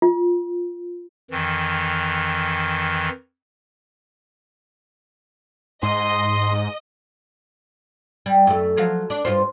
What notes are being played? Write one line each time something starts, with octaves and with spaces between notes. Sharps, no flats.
F4
F2 D#3 E3
G#2 D#5 C6
G3
F#2 A3
F3 F#3 F5
D4
G2 F4 C5